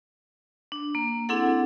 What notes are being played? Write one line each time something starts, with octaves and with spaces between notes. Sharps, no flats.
D4
A#3
C4 D4 E4 G#4 A4 F#5